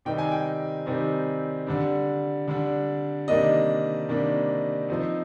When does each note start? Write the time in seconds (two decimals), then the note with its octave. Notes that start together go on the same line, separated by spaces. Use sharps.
0.05 C3 D#3 G3 C4 D#4 G5
0.18 G#5
0.31 G5
0.86 C3 D#3 G3 C4 D#4
1.67 D3 G3 D4
2.48 D3 G3 D4
3.28 C3 D#3 G3 A#3 D4 D#5
4.09 C3 D#3 G3 A#3 D4
4.89 F3 C4 D#4